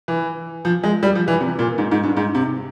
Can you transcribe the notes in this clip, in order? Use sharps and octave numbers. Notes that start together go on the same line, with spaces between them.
E3
F3
G#3
G3
F3
E3
C3
A#2
G#2
G#2
G2
G#2
C3